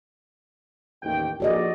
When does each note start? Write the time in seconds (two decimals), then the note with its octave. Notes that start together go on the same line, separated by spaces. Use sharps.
1.02 A1 D#2 G5
1.40 A#1 F#4 A4 D5 D#5